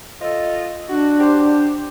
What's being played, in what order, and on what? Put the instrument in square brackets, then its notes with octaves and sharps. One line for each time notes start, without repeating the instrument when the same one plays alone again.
[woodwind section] F4 A4 D#5
[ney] D4 [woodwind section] F#4
[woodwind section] G4 C5